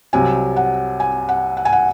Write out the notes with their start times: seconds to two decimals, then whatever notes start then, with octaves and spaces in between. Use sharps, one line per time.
0.13 C2 C3 F#3 G#5
0.56 F#5
1.00 G#5
1.29 F#5
1.57 F#5
1.65 G#5
1.73 F#5